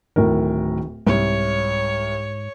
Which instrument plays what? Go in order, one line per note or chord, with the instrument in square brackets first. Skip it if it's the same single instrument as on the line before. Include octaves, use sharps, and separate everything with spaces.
[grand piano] D1 A2 A#4 [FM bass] D#3
[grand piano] C2 [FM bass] G#2 [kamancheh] C#5